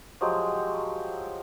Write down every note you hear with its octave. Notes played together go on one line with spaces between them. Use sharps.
F3 F#3 G#3 G4